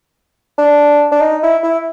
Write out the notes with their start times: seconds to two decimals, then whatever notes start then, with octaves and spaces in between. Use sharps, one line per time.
0.58 D4
1.12 D4
1.21 D#4
1.43 E4
1.63 E4